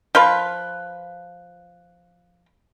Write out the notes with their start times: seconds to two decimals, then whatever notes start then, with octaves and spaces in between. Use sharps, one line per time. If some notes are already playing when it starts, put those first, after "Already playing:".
0.15 F3 F4 B4